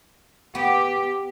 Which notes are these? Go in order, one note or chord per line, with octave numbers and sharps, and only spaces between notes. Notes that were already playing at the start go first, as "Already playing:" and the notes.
B3 G4